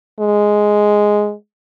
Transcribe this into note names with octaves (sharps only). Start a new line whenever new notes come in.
G#3